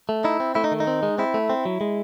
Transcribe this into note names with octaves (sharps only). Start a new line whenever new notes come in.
A3
D#4 E4
C4
A3 E4
D#4
D#3
D#4
C4
G#3
C4 E4
A3
C4
F#3
G#3